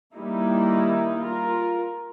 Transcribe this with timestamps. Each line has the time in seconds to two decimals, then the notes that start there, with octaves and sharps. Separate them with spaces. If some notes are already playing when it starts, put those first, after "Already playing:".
0.15 D#3 G3 A#3 D#4 E4
1.21 F4 A#4